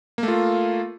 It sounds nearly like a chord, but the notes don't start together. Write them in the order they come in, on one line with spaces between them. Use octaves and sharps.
A#3 A3 F4